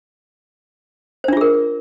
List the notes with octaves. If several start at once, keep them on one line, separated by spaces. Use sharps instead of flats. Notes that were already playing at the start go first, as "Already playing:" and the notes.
D4 F4 G#4 A#4 C5